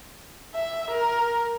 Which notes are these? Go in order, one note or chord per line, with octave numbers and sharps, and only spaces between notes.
E5
A#4